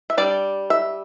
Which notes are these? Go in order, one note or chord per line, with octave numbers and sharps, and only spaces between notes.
E5
G3 D4 D5
E5